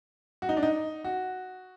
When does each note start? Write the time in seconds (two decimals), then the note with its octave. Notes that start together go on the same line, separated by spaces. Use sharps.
0.42 F#4
0.49 D#4
0.57 D4
0.63 D#4
1.04 F#4